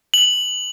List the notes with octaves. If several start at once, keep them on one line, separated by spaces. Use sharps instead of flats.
F#7